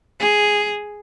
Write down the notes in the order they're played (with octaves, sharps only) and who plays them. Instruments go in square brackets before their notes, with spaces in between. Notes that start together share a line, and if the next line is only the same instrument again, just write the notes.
[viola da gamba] G#4